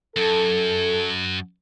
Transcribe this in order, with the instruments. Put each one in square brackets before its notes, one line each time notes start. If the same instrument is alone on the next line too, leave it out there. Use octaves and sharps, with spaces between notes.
[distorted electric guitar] F#2 [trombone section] A4